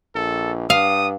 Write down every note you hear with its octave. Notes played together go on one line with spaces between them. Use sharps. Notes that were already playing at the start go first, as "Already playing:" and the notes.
A#1 A4
G2 F5 D#6